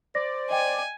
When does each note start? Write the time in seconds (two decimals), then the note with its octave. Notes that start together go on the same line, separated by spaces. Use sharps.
0.15 C5 D5 A#6
0.50 D#5 G5 G#5